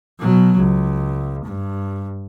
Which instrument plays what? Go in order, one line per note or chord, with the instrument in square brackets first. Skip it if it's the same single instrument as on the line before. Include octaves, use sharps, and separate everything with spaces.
[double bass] B2 F#3
C#2
G2